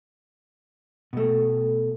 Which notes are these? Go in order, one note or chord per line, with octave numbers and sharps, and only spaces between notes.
B2 A3